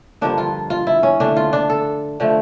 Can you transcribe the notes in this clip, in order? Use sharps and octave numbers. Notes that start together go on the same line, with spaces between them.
G2 D3 F3 A#3 D4
F4
F4
E4
C#4
D3 A3 D4
F4
D4
A4
D3 F3 A3